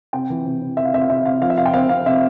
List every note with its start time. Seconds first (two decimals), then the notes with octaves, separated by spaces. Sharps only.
0.13 C3 G5
0.30 E3
0.45 C3
0.61 C3
0.77 C3 E5
0.85 F5
0.93 C3 E5
1.01 F5
1.09 C3 E5
1.25 C3 F5
1.41 F3 F5
1.50 E5
1.57 C3 F5
1.65 G5
1.74 C4 F5
1.89 C4 F5
2.06 C3 E5